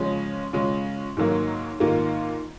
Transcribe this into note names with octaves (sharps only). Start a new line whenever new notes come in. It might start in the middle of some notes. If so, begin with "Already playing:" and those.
Already playing: C#3 F3 G#3 C#4
C#3 G#3 C#4 F4
G#2 D#3 F#3 A#3
G#2 D#3 A#3 F4